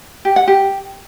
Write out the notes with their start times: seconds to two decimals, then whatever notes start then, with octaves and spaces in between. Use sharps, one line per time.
0.25 G4
0.36 F#5
0.48 G4